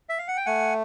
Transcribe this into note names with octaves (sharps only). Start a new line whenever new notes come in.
E5
F5
F#5
G5
A3 F#5 G#5